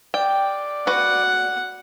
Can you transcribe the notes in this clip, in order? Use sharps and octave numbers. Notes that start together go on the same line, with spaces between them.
D5 G5
F#4 B4 F#5